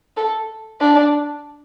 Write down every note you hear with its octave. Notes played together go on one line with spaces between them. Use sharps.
A4
D4